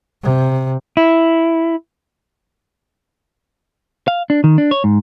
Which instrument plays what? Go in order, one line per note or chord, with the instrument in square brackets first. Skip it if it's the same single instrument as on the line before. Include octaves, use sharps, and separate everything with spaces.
[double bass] C3
[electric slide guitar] E4
[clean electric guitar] F5
D4
D#3
D4
C#5
G#2